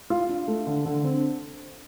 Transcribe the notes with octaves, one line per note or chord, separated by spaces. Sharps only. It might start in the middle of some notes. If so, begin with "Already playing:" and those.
F4
D4
A3
D3
D3
C4